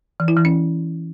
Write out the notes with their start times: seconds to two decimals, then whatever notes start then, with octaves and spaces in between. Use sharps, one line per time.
0.20 E3
0.28 E4
0.36 E3
0.45 C#4